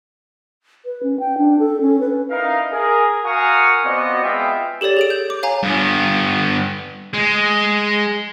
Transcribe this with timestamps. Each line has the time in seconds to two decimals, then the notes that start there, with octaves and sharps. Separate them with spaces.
0.85 B4
1.03 C#4
1.19 G5
1.38 D4
1.59 A4
1.81 C#4
2.00 B4
2.30 D#4 E4 A#4 F5
2.71 G#4 A#4
3.24 F#4 A#4 F5 G#5 C#6 D#6
3.84 B3 C4 F4 F#4 D5 D#5
4.23 G#3 B3 F4 E5 F5 G5
4.81 G4 A4 C#5 D5 A6
4.97 G#4 A4 D7
5.10 G6
5.30 D6
5.43 C#5 F5 G#5 A#5
5.63 G2 B3
7.14 G#3